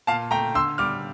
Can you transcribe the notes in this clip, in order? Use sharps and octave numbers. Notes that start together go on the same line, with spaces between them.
A#2 F5 A5
A3 G5 A#5
D3 C6 E6
G3 D6 F6